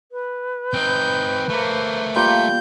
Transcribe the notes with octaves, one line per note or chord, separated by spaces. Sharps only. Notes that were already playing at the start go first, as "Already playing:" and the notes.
B4
C4 D#4 G6
A3 A#3 A#4 C5
G3 A#3 F4 G6